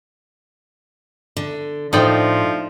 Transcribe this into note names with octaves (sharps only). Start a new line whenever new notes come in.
D3
A2 F3 D4 D#4 A4 C5 D5 G5